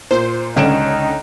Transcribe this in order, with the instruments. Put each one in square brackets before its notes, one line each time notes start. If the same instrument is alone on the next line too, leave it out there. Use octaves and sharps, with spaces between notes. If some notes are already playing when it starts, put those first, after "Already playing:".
[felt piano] A#2 [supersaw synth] C5
[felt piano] C#2 D7 E7 [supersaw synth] D3 C#4 [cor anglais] D#4